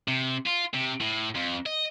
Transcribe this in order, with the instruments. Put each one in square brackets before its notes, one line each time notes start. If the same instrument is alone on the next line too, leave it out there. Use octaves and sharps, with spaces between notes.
[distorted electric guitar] C3
F4
C3
A2
F2
D#5